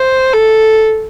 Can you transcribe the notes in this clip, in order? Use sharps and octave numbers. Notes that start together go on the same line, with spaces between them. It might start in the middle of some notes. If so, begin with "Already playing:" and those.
Already playing: C5
A4